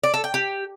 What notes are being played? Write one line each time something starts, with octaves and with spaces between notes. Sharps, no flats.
D5
A4
G5
G4